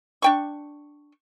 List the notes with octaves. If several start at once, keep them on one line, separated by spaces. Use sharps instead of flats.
D4 G5 C#6